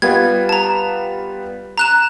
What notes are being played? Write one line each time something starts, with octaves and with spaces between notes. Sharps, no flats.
G3 B3 F4 G#6
A5 A#5
A#5 F#6 E7